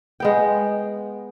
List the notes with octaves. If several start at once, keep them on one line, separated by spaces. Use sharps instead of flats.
G#3 B3 G5